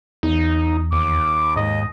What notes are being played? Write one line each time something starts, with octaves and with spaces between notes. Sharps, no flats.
E2 D#4
D#2 D6
G#2 D#5